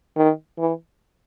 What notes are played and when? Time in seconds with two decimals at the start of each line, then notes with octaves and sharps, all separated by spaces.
0.17 D#3
0.59 E3